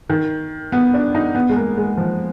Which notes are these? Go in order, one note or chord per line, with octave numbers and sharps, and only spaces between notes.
D#3
B3
D4
D#4
B3
G#3
A#3
G#3
F3